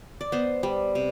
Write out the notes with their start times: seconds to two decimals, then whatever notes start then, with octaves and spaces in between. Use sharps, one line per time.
0.21 D5
0.32 B3 C5
0.63 G3
0.95 C3